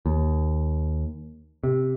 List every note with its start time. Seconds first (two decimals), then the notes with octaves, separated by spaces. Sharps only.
0.06 D#2
1.64 C3